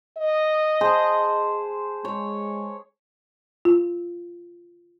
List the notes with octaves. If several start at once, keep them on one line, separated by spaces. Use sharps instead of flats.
D#5
G#4 C5 A5
G#3 C#5
F4